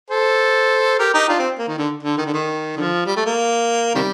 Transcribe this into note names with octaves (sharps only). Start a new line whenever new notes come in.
A4 C5
G4 A#4
D#4 G4
D4 F4
C4
A#3
D#3
D3
D3
D#3
D3
D#3
D3 F3
G3
A3
A#3
C3 D#3 G3